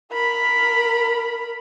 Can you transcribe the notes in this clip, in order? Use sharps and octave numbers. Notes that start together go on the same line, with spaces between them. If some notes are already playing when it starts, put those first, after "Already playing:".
A#4 B5